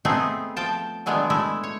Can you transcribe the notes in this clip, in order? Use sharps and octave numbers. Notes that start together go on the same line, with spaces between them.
A3 B3 C4 D#4 G#4 B4
F3 G5 A5
D#3 F#3 G#3 A3 B3 D4
G#3 A3 E4
C#5